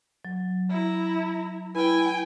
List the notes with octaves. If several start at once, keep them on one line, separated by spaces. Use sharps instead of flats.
F#3
E4 A#5
E4 B4 G5 G#5